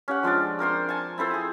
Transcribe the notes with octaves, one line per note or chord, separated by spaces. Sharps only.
C#4 G4 F#5
F3 G#3 D4 D5
C4 A#4 C5 C6
G#5 A5 C#6
C4 E4 A4 C5
G#4 G#5